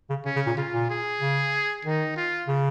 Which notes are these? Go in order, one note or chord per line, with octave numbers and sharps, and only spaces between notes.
C#3
C#3 C#4
C#3
A#2
C#3 F4
A#2
G#4
C#3
D#3 D#4
F4
C#3